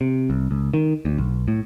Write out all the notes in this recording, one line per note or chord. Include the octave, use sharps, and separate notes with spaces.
C3
C2
C#2
D#3
D2
B1
A2